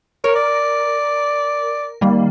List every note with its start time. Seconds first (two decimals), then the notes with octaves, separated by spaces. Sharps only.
0.24 A#4 C#5
0.35 D5
2.01 D#3 G3 A#3